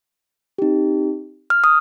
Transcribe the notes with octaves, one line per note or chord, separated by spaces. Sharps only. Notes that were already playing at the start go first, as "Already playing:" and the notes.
C4 D#4 G4
F6
D#6